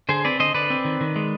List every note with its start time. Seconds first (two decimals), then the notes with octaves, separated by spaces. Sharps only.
0.09 D3 G#4 C5
0.25 C4 B4 D5
0.39 D3 C5 D#5
0.54 D3 B4 D5
0.70 C4
0.85 D#3
1.01 D#3
1.16 G#3